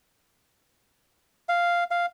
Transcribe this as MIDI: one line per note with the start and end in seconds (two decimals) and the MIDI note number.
1.49 1.84 77
1.91 2.06 77